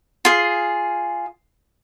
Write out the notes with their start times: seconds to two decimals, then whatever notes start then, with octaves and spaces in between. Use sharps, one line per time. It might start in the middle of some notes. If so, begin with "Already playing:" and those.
0.25 F4 G#4